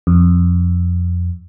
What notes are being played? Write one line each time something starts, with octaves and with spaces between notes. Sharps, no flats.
F2